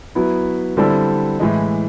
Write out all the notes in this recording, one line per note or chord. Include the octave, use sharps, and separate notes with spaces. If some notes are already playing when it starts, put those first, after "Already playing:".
F#3 B3 E4
D3 G3 C4 E4 A4
A2 E3 G#3